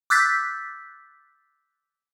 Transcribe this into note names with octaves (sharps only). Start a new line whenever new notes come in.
D6 E6 F#6 G6 A6 B6